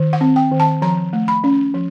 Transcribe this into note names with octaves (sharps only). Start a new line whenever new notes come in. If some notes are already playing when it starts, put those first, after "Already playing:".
Already playing: D#3
F#5
C4
G5
D#3
A5
F3 A#5
A3
B5
C#4
F3